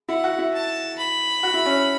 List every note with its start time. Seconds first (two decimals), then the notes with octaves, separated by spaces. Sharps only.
0.09 E4 F#5
0.24 F#4
0.39 E4
0.54 A5
0.98 B5
1.43 F#4
1.54 E4
1.66 C#4